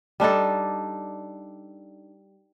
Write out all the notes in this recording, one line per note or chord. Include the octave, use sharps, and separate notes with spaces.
G3 D4 D#4 A4